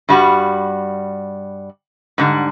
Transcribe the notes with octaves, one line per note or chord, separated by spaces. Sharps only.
G2 G3 F#4
G#2 D3 G3